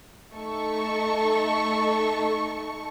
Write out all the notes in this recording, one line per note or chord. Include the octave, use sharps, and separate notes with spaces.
A3 D#4 A4 C#6